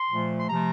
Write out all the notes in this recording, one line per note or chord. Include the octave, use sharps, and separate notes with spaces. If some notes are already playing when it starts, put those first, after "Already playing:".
Already playing: C6
A#2 F3 A3
C6
C3 F3 A3 A#5